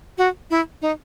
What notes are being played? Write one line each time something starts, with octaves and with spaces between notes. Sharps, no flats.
F#4
E4
D#4